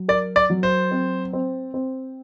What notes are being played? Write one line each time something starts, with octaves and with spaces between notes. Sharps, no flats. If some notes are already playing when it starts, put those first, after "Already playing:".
Already playing: F#3
A#4 D5
D5
F#3
C5
C4
C4
C4